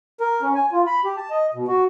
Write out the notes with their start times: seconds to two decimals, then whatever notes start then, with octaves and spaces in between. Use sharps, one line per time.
0.20 A#4
0.42 C#4
0.55 G#5
0.72 F4
0.87 B5
1.05 G4
1.17 A5
1.31 D#5
1.54 B2
1.68 F#4